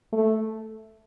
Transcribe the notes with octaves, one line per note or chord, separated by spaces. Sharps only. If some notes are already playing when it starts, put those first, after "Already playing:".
A3